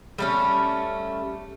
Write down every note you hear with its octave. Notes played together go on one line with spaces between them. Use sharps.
G3 A3 C#4